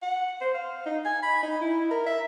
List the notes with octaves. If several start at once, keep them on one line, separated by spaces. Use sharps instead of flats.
F#5
C5
F5
D#4
G#5
B5
D#4
E4
A#4
E5